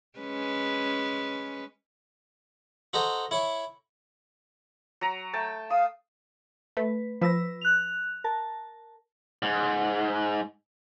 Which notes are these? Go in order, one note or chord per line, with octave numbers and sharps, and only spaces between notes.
G#3 C#4 B4
F#4 A4 C5 D#5 A#5
E4 C#5
F#3 A#5
A3 G5 A5
F5 D#6
A3 B4
F3 B4 E6 A#6
F#6 F7
A#4 A5
G#2